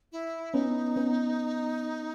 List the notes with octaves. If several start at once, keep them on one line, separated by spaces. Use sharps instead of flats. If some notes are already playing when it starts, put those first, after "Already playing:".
E4
B3 C#4 D#4
B3 C#4